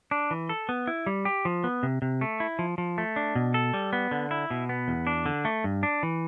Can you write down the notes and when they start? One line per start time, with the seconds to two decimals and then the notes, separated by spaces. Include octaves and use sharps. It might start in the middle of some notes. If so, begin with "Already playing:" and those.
0.11 D4
0.31 E3
0.49 A4
0.69 B3
0.87 E4
1.06 G3
1.25 G4
1.45 F3
1.64 B3
1.83 C3
2.02 C3
2.21 A3
2.40 E4
2.59 F3
2.78 F3
2.98 A3
3.16 D4
3.35 B2
3.54 A4
3.74 G3
3.93 B3
4.11 D3
4.31 E4
4.50 B2
4.69 B3
4.88 E2
5.07 D4
5.26 D3
5.45 A3
5.64 G2
5.83 D4
6.03 E3